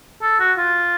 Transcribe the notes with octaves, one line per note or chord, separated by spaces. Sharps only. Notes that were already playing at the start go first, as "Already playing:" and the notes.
A4
F#4
F4